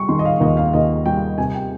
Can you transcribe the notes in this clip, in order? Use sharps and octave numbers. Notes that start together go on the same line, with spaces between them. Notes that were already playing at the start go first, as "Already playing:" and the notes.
Already playing: G3 C#6
D#3 C6
D#5
F5
D#2 D#5
F5
D#2 D#5
G3 G5
C3 G#5
G5